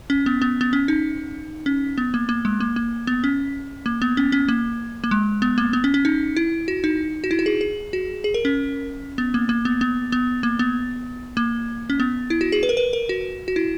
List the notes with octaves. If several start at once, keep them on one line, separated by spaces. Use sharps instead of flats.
C#4
B3
B3
B3
C#4
D#4
C#4
B3
A#3
A#3
G#3
A#3
A#3
B3
C#4
A#3
B3
C#4
C#4
A#3
A#3
G#3
B3
A#3
B3
C#4
C#4
D#4
E4
F#4
D#4
F#4
E4
F#4
G#4
G#4
F#4
G#4
A#4
C#4
B3
A#3
A#3
B3
B3
B3
A#3
B3
A#3
C#4
B3
E4
F#4
G#4
B4
A#4
B4
A#4
F#4
F#4
E4